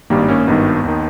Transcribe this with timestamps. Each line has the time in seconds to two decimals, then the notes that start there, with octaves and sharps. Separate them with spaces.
0.10 G#1 G2 D#3 G3 A#3
0.28 A#3 C#4
0.47 G#1 G2 D#3 B3 D#4
0.84 D#2 D#3